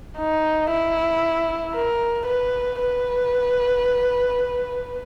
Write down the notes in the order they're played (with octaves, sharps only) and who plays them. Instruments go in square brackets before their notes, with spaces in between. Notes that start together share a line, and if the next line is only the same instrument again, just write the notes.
[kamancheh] D#4
E4
A#4
B4
B4